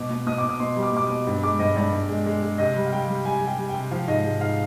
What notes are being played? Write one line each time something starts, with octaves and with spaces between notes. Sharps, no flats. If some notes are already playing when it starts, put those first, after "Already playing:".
Already playing: B2 D6
B2
B2 D#6
D6
B2 D#6
B2 C6
G3
D6
B2 D6
D#6
B2
G2
G#3 D6
G2 D#5
G2 D5
G2
G#3
G#3
G#3
C3 D#5
G3
F5
G3 G5
G3
G3 G#5
G3
G5
G3
C3 G5
F3 F5
G#2 D#5
G#2
G#2 F5